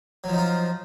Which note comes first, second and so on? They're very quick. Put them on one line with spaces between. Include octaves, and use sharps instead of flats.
F#3 F3 D#4 F4